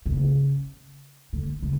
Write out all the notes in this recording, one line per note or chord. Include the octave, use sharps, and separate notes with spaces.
C3
C#3
D3
C#3